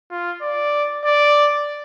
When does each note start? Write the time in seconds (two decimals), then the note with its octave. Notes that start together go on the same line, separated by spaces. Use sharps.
0.11 F4
0.42 D5
1.05 D5